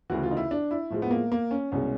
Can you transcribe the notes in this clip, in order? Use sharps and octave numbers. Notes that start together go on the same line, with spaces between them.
D2 C#3 E3 F#4
F4
D#4
E4
D4
E4
A2 F3 G#3
B3
A#3
A#3
C#4
C2 B2 G#3 C#4